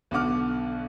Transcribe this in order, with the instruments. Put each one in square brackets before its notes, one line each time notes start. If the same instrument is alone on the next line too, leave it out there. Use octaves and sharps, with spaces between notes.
[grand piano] B1 B2 D3 F#5 D6 F6